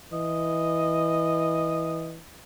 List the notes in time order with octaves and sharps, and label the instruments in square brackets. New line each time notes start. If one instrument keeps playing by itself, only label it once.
[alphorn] E3 [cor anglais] D#5